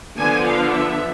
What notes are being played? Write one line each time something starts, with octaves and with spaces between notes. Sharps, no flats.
D3 F3 B3 D4 G#5
F5
E5